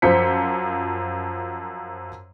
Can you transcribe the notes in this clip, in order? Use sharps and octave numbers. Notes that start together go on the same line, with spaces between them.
F#2 F3 C5 B6 C#7